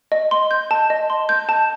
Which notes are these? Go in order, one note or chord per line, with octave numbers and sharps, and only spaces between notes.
D#5
C6
G6
A5
D#5
C6
G6
A5